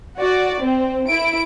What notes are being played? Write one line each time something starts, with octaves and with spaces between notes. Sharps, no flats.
F#4 D5
C4
E4 D7